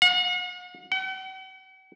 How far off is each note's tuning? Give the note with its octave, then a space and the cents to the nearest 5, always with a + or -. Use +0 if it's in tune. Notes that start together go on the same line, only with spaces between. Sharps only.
F#5 -45
F#5 +45